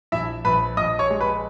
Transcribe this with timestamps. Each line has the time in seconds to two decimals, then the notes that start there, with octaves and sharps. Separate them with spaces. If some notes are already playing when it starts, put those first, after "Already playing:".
0.12 A#1 E4 E5
0.45 A#1 B4 B5
0.77 A#1 D#5 D#6
0.99 C#5 C#6
1.10 G#3
1.21 B4 B5